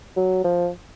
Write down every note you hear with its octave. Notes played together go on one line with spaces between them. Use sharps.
F#3
F3